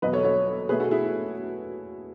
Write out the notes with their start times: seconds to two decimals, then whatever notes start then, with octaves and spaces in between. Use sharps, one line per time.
0.02 E2 B2 F#3 B3 B4 D#5
0.13 A4 C#5
0.24 A4 C#5
0.69 B2 A3 G#4 B4
0.80 F#4 A4
0.91 E4 G#4